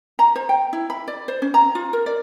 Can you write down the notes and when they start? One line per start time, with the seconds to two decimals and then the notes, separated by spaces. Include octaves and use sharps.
0.19 A#5
0.36 C5
0.49 G5
0.73 E4
0.90 B5
1.08 D5
1.28 C5
1.42 C#4
1.54 A#5
1.75 F4
1.93 A#4
2.06 D5